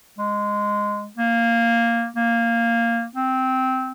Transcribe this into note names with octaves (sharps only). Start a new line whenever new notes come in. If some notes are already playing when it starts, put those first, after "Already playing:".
G#3
A#3
A#3
C4